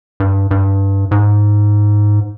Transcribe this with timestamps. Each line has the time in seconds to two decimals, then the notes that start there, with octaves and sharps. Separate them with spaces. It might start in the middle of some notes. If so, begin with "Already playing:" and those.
0.20 G2
0.51 G2
1.11 G#2